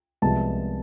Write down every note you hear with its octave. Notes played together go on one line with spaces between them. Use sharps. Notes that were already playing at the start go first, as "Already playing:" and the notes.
C2 C3 F3 G#3 B3 A5